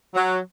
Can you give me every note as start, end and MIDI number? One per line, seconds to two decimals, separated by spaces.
0.15 0.37 54